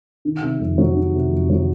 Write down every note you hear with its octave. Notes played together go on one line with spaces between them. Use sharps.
D#3
C3
F2
F#3
D#3
C3
F2
F#3